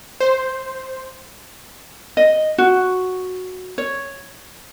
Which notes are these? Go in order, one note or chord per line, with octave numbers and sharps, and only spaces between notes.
C5
D#5
F#4
C#5